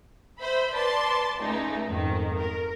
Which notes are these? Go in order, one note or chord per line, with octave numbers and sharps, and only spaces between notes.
C5 E5 B5
B4 D5 A5 C6
C#2 A3 D#4
F2 G#2 D#3
A#4